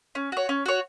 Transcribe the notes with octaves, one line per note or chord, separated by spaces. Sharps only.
C#4
F#4 C#5
C#4
F#4 C#5